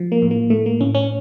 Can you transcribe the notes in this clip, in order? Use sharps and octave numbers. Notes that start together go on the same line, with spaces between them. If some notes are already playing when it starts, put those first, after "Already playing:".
Already playing: F3
A#3
A2
A#3
A2 A3
A#3
A2 C#4
C#4